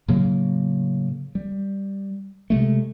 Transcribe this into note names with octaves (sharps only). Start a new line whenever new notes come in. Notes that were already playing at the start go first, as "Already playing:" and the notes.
A2 C#3 F#3 A#3
G3
C3 G#3 A3